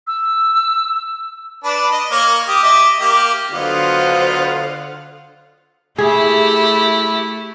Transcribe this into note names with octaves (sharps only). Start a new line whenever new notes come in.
E6
D4 B4
D#5
A#3 A#4 C#5
G4 D#6
D#5 E5 D6
A#3 G4
D3 F#3 B3 F4 C5 D#5 F5 F#5
A3 E4 G4 G#4